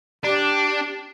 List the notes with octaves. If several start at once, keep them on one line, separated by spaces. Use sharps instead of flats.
D4 G4